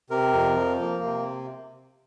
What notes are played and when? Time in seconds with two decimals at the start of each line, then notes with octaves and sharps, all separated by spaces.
0.10 C3 A#4
0.33 F2
0.56 F3
0.80 A#3
1.03 C3